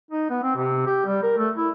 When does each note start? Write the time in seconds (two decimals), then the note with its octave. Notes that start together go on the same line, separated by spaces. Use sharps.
0.11 D#4
0.30 B3
0.43 C4
0.55 C3
0.87 G4
1.05 G3
1.23 A#4
1.37 A3
1.57 E4